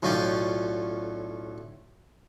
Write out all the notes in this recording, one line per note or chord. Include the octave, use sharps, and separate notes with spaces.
B1 A2 C#4 F4 D5 G5